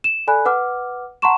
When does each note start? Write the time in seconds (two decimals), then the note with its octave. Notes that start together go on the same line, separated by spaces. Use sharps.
0.04 E7
0.27 A4 D5 G#5 B5 F#6
0.45 B4 F#5 D6 F6
1.22 F#5 A5 A#5 C6 C#6 E7